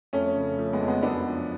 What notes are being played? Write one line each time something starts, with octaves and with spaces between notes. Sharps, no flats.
F2 A3 C#4
C#3
F3 A3
G#3 B3
F2
G#3 B3
F#2 B3 D4
F3